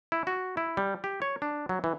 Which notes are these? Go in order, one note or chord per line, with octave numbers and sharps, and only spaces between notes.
E4
F#4
E4
G3
G4
C#5
D4
F#3
E3